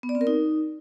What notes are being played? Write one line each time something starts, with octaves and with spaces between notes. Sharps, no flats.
B3
D5
C4
A#4
D#4